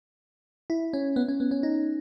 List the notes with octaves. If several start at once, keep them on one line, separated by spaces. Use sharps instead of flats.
E4
C#4
B3
C#4
B3
C#4
D#4